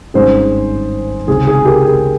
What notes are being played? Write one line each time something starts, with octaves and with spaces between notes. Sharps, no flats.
G#1 G2 D#3 G#3 C#4 G#4 C5
C#2 C3 D#3 G#3 G#4
G#4
G4 A#4
G#4